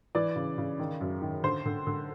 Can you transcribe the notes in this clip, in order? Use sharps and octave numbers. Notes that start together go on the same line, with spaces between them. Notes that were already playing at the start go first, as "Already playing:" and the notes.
E3 D5
C#3
C#3
D#3
F#2
D#3
D3 C5
D3
D3